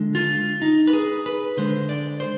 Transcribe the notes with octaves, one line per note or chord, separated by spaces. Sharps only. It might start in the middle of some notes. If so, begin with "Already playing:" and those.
Already playing: D3 G#3
F4
D#4
B4
G#4
B4
D3 G#3 C5
D5
C5